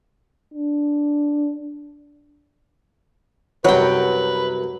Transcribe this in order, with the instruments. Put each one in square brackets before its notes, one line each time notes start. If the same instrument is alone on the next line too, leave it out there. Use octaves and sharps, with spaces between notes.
[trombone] D4
[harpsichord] C2 F#2 [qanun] F#3 G5 [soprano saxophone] B4